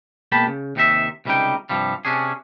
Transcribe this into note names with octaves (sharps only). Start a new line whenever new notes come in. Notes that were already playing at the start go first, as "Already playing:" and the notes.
B2 G#3 A#3 G5 A5 B5
C#3
D#2 C3 D#4 G4 E5
C#2 C3 G3 A3 D#4 G5
G2 C3 F3 G3
C3 C#4 D4 G#4